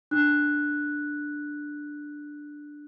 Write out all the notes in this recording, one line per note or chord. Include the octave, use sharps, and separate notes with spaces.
D4 F#6